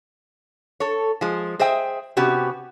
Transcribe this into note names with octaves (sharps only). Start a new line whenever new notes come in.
A4 C#5
F3 G#3
G#4 C5 D#5 E5 G5
C3 B3 C#4 F#4 G4